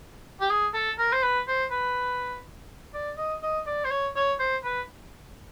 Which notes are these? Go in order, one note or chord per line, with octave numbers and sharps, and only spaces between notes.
G4
G#4
A4
A#4
C5
B4
C5
B4
D5
D#5
D#5
D5
C5
C#5
C#5
C5
B4